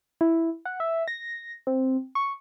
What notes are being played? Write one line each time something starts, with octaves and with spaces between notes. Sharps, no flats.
E4
F#5
E5
A#6
C4
C#6